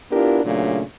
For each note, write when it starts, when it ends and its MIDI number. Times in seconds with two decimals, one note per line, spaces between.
0.11 0.40 59
0.11 0.40 62
0.11 0.40 64
0.11 0.40 65
0.11 0.40 67
0.11 0.40 70
0.45 0.81 46
0.45 0.81 49
0.45 0.81 54
0.45 0.81 57
0.45 0.81 62